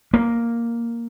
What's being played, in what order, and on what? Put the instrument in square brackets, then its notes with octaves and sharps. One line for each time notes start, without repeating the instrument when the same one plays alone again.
[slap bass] A#3